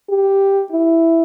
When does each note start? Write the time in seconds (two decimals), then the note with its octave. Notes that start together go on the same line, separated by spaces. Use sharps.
0.10 G4
0.72 E4